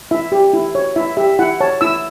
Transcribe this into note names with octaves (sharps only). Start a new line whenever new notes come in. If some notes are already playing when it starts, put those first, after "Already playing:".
E4 E5
G4
E4
C#5
E4 E5
G4 E5
E4 F#5
C#5 A5
E4 E6